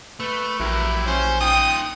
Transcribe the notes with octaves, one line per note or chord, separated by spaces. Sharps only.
A3 B4
A#1 F#3 E4 G4 A#4
C#4 C5
D#4 F4 G5 D#6